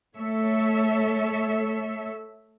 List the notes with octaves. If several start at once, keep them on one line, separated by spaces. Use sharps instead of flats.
A3 A4 C#5 E5